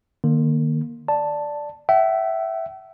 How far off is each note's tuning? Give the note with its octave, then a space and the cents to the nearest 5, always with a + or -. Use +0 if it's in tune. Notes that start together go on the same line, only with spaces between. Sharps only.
D#3 -35 A#3 +15
D5 +0 A5 +5
E5 +5 G5 -45